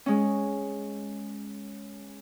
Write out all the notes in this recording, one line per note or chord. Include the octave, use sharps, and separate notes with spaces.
G#3 C#4